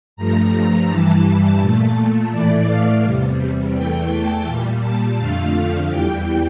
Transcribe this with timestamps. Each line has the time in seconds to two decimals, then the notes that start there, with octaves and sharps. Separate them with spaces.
0.16 G2 F3 A3 A#5
0.87 G2 E3 G3 A5
1.59 A#2 A3 A5
1.95 A5
2.31 A2 E3 A3 D5
2.67 F5
3.02 E2 C3 G3
3.73 E2 E3 A3 G5
4.09 A5
4.46 A#2 G3
4.81 A5
5.17 F2 D3 F3 A3 F5
5.88 E2 E3 G3 G5